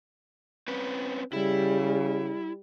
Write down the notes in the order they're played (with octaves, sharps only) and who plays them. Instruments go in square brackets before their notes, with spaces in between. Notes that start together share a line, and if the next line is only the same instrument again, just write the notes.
[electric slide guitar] C4 C#4 B4
[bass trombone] C#3 [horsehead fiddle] G3 [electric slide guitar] E4